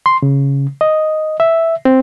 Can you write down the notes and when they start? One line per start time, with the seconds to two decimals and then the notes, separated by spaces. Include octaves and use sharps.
0.06 C6
0.22 C#3
0.81 D#5
1.40 E5
1.85 C4